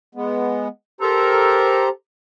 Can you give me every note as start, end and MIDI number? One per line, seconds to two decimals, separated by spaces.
0.15 0.68 56
0.15 0.68 59
1.01 1.89 67
1.01 1.84 69
1.01 1.84 70
1.01 1.89 72
1.01 1.89 82